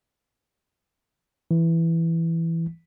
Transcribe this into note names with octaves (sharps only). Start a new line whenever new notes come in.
E3